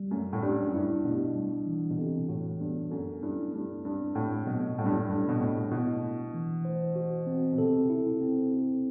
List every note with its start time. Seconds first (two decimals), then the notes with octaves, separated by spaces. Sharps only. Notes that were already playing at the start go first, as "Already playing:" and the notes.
Already playing: G3
0.11 F#2 A3
0.33 A2
0.42 G2 G4
0.67 F#2
0.74 G2 E4
1.05 B2 D4
1.36 G3
1.66 E3
1.90 B2
1.97 C3 A4
2.29 A2 F#4
2.60 G2 B3
2.91 F#2 A4
3.22 G2 E4
3.53 G2 A3
3.85 G2 C4
4.15 A2 A3
4.47 B2 F#3
4.78 A2 G3
4.85 G2
4.93 A2
5.09 G2 A4
5.29 B2
5.41 A2 D4
5.71 B2 E4
6.03 A3
6.34 E3
6.65 C5
6.96 F#4
7.27 C4
7.53 B2
7.58 C3 A4
7.90 E4
8.21 C4
8.51 E4